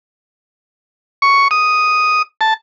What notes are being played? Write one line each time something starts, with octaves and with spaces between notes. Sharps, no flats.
C#6
D#6
A5